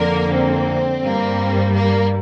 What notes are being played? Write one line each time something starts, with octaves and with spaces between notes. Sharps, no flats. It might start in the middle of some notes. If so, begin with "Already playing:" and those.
Already playing: F2 D3 A#3 A#4
C4
G2 G3 A#3
A#3